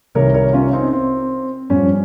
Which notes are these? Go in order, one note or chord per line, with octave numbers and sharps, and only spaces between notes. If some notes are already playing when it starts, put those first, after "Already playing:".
C2 C3 D#3 A#4 C#5
A#4 C#5
C#4 F4
C4 D#4
C4
G2 F3 C#4